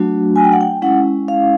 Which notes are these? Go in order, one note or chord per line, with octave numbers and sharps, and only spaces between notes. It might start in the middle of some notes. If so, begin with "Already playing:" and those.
Already playing: F#3 A3 D4 F#4
G#5
G5
F#5
G5
G#3 C#4 E4 F#5
F5